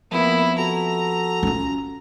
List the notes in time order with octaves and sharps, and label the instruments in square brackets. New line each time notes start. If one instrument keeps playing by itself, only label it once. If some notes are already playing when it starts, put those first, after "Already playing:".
[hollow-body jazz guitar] F2 B3 [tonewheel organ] A#3 [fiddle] E4
[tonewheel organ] F#4 A4 [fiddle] A#5
[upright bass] C#4 F4